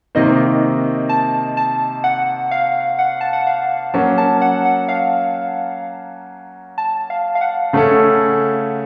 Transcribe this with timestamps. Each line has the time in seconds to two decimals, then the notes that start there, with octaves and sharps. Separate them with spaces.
0.15 C3 D#3 A#3 D#5
1.09 A5
1.57 A5
2.04 F#5
2.51 F5
2.99 F#5
3.21 A5
3.33 F#5
3.47 F5
3.94 F#3 A#3 C#4 A5
4.18 A5
4.41 F#5
4.65 F#5
4.89 F5
6.78 A5
7.10 F5
7.35 F5
7.41 F#5
7.73 C#3 A3 C#4 A4